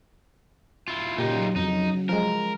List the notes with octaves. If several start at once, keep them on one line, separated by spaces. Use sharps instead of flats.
E4 F4
A#2 C#3 F#3 D#4 F4 G4
F2 D#4
F3 G#3 A#4